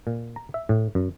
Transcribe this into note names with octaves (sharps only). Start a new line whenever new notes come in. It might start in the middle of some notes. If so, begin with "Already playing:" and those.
A#2
A#5
E5
A2
F#2